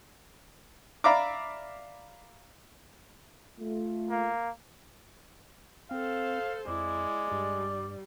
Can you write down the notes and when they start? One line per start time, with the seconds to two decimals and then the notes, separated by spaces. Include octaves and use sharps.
1.04 D5 E5 F5 A#5 B5 D6
3.59 A3 F4
4.09 A#3
5.91 C4 A4 C5 F5
6.68 F2 G#3 E4 D5
7.32 G2 G3